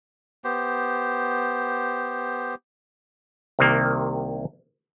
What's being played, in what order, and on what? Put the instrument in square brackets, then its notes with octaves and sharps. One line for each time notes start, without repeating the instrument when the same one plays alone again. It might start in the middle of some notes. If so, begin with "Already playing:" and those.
[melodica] B3 G4 C5
[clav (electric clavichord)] C2 C3 D#3 A#3